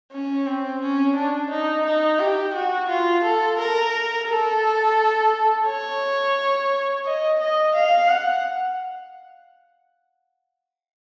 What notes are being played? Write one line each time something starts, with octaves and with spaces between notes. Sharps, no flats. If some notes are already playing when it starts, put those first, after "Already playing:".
C#4
C4
C#4
D4
D#4
D#4
G4
F#4
F4
A4
A#4
A4
C#5
D#5
D#5
F5
F#5